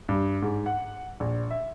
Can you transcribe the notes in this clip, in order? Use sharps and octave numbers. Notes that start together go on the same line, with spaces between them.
G2
G#2
F#5
A#1
E5